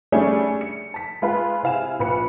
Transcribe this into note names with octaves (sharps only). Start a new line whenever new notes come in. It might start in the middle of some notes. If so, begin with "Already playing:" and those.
G3 A3 C#4 D4 G#4 D5
C#7
A5 B6
G#3 F4 B4
C3 E4 F5 G#5 E7
A#1 B4 C#7